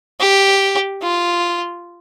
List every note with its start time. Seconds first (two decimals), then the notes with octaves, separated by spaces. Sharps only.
0.20 G4
1.02 F4